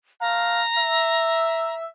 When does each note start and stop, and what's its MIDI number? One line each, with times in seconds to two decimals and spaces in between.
0.21 0.62 57
0.21 0.62 77
0.21 1.75 82
0.77 1.90 76